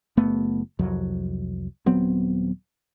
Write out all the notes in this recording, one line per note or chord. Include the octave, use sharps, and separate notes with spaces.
F#1 A3 B3
C2 F2 F#3
D#1 F#3 B3 C4